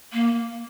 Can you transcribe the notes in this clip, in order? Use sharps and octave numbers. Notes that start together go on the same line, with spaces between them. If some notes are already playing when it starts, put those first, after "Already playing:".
A#3